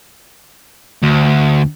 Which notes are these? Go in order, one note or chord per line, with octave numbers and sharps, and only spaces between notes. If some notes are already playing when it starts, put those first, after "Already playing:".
D2